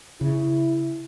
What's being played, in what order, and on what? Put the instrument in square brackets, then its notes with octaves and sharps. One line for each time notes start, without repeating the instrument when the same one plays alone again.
[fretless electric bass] C#3 [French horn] E4